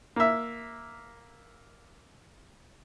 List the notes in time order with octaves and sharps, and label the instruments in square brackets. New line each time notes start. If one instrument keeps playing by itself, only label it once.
[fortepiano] A#3 E5